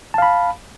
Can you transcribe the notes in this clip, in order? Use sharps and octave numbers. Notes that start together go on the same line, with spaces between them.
F5 A5 B5